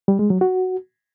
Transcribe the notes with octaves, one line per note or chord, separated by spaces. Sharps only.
G3
G#3
F#3
F#4